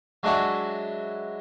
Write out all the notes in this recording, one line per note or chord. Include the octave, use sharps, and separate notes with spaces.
F#3 G#3 D4 E4 F#4